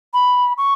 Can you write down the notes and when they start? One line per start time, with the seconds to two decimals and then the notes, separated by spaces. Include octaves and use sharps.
0.13 B5
0.57 C#6